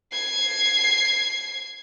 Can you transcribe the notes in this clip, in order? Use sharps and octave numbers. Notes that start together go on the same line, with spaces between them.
G#6 C7